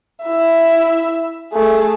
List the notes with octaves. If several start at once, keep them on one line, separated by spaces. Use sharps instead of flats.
E4 E5
A3 G#4